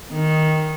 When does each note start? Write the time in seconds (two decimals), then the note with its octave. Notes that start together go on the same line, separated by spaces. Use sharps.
0.12 D#3